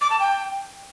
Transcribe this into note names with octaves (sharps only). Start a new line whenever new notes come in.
D6
A5
G5